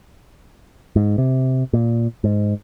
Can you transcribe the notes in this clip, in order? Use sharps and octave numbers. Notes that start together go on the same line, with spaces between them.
G#2
C3
A#2
G#2